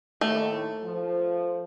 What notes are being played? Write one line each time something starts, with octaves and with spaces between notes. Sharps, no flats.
D#2 A2 A3
F3